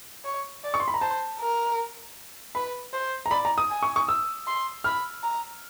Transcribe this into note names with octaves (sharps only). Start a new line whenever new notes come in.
C#5
D5
C#6
C6
B5
A#5
C5 A5
A#4
B4 B5
C5
A#5
D5 B5
A#5
D#6
G#5
C#6
C#6
E6
C6
B5 F6
A#5